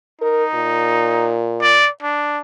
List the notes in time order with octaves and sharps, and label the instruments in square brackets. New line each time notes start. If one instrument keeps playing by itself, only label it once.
[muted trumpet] D#4 [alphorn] A#4
[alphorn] A#2
[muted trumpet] D5
D4